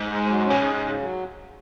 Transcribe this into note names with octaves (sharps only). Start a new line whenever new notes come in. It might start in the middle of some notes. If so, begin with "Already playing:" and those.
Already playing: G#2
G#3
F#3
C#4
B2
G#2 G#4
C#3
F#3